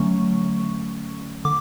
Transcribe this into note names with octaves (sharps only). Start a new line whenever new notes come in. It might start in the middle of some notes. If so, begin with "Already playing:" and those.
Already playing: D3 F#3 A3 C#4 C#6
D3 D6